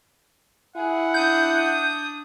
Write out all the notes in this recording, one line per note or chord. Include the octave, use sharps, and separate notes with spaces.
E4 G#4 F#5
D4 D#6 G6